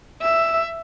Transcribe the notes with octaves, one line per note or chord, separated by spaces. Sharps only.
E5